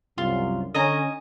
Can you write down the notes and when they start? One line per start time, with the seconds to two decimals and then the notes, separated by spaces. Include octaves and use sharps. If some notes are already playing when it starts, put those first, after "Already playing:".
0.18 C2 F#2 F4
0.74 D3 C#4 D#5 G#5 A#5